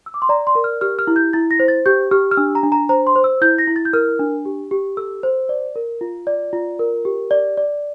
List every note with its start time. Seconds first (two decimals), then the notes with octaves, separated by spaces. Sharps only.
0.06 E6
0.14 D6
0.22 C6
0.29 D5 A#5
0.47 C6
0.55 A#4
0.64 F6
0.81 G4 F6
0.99 F6
1.07 E4
1.16 G6
1.33 E4 A6
1.51 A#6
1.60 C5
1.68 A6
1.86 G4 G6
2.11 G4 F6
2.31 F6
2.37 D4 E6
2.55 A#5
2.63 D4
2.72 A#5
2.89 C5 A#5
3.07 C6
3.16 C5
3.24 E6
3.41 E4 G6
3.58 A#6
3.67 E4
3.76 A6
3.85 G6
3.93 A#4 F6
4.19 D4
4.45 G4
4.71 G4
4.97 A4 E6
5.23 C5
5.49 D5
5.76 A#4
6.01 F4
6.27 D5
6.53 F4
6.79 A#4
7.05 G4
7.31 D5
7.57 D5